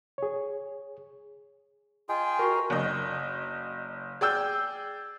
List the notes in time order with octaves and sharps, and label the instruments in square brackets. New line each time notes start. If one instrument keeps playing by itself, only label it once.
[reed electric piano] G#4 C#5
[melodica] F4 G#4 G5 [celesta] D#5 [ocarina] G#5
[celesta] F#4 C#6 C7 [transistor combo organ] A#4
[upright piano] F#1 D4 D#5
G#4 D5 G5 E6 G6